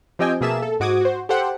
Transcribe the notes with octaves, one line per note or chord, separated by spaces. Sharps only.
F3 C4 G4 D#5 G5 G#5
B2 A#3 G#4 E5 A5 E7
A4
G#2 F#4 D6 D#6 G#6
F#4 C5
G4 A4 C5 F#5 G5